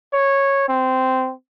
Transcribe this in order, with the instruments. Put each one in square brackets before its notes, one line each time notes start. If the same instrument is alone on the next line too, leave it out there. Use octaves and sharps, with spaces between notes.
[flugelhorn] C#5
C4